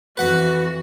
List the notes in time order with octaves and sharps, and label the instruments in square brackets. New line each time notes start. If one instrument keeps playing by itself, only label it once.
[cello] F2 E3 [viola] F#4 [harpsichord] B4 F#5 B5